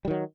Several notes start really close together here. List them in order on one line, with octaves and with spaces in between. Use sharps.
G3 D#3 F#3